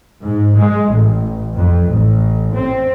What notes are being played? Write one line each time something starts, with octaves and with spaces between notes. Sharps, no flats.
G#2
G#3
A1
F2
A1
C4